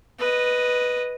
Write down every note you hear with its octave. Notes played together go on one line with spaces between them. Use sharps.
B4 D#5